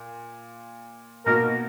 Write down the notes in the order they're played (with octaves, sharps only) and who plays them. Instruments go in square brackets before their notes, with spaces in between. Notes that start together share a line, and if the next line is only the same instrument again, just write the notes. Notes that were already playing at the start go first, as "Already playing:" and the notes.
Already playing: [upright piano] A#2
[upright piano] B2 A#3 D#4 F#4 [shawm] A#4